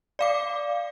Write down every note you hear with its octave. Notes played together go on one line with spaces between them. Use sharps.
D5 F5 D6